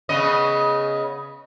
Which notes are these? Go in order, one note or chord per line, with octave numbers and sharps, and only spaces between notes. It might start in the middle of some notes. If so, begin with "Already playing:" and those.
C#3 B3 D#5